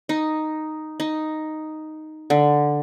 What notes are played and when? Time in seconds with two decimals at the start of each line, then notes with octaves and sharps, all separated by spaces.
0.09 D#4
1.00 D#4
2.30 D3